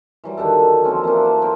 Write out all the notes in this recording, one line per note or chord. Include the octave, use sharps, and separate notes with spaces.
E3 F#3 G3
D3 D#3 D4 A4
F3 A#3 C4 C#4
E3 A#3 C4 D4
A5
F#3 C4 D4 A#4